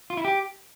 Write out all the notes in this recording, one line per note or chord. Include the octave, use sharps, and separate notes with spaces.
F4
E4
G4